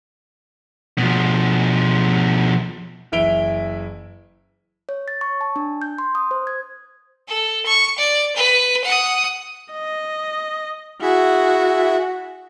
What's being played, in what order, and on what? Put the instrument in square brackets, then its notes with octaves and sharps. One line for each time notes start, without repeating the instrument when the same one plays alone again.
[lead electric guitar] B2 F3
[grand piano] F#1 E3 E4 D7 F7 G7
[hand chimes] C#5
A6
C#6
A5
D4
G6
C6
D#6
C5
G#6
[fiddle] A4
C#6
D5
B4
F#5 D#6
[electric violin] D#5
[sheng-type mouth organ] E4 G#4 E5 [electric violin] F#4